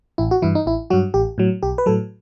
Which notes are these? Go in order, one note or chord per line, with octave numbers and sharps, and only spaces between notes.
A1 E4
F#4
G2 E3 E4
D#4
A1 E4
G2 F#3 F#4
A1 G4
A2 F#3
B1 G4
B4
A2 F#3 A4